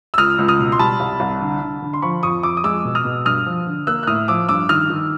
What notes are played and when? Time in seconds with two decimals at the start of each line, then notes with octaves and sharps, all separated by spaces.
0.14 E6
0.18 C#2 D#6 F6
0.38 C#2
0.48 D#6 F6
0.59 B2
0.72 C6
0.79 G3 A5 B5
1.00 C2
1.20 C2
1.41 D3
1.61 D3
1.82 D3
1.93 C6
2.02 F3 B5 C#6
2.23 F2 C#6 D#6
2.43 F2 D6 E6
2.57 D#6
2.64 G#3 D6 E6
2.85 B2
2.95 D#6 F6
3.05 B2
3.26 G2 D#6 F6
3.46 F3
3.67 D3
3.87 A#3 E6 F#6
4.03 F#6
4.07 A2 D#6 F6
4.28 F3 D6 E6
4.49 G2 D6 E6
4.69 D#3 D#6 F6
4.90 D#3